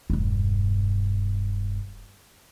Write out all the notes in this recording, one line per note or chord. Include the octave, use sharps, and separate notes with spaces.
E1 G2